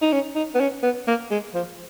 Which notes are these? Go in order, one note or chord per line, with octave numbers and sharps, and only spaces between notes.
D#4
C#4
D#4
B3
C#4
B3
A#3
G#3
F3